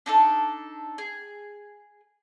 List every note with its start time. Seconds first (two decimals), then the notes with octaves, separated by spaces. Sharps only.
0.06 D4 D#4 A4
0.98 G#4